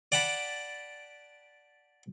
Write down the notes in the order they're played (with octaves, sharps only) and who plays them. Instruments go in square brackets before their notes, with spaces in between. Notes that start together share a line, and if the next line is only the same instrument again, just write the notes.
[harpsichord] D5 F#5 G5 A5 B5